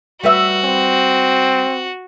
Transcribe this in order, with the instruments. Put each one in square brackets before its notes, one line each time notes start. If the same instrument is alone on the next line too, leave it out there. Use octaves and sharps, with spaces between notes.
[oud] G3 B4 E5 [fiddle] F#4
[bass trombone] C4